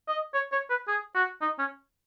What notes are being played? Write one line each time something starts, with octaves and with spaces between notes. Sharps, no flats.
D#5
C#5
C#5
B4
G#4
F#4
D#4
C#4